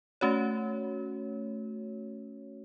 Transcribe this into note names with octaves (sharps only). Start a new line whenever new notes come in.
A3 C#4 F#4 C#5